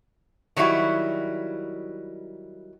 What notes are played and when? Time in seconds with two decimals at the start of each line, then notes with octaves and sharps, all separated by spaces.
0.56 D#3 F#3 G3 E4 F#4